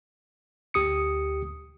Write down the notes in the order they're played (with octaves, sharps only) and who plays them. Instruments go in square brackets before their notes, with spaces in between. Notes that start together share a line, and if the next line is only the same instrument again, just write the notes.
[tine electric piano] D2 G4 D#6 C#7